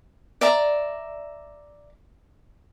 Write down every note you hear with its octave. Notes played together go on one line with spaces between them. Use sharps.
D5 E5 A#5